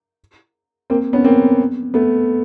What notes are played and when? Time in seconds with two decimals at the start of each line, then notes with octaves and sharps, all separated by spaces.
0.90 A#3 C4
1.13 B3 C#4
1.24 A#3 C4
1.94 A3 B3